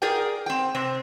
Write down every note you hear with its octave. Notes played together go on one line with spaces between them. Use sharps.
G#4 A#4 D5 F5 G5
C4 G5
C3 C4